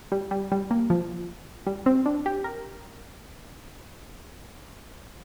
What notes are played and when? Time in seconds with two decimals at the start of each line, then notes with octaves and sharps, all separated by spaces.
0.12 G3
0.31 G3
0.52 G3
0.71 A#3
0.90 F3
1.67 G3
1.86 C4
2.06 D4
2.26 G4
2.44 A#4